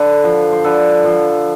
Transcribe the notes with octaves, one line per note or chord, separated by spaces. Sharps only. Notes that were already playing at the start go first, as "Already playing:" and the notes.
Already playing: D3 A4 B4
F3
C5
D3 A4 B4
F3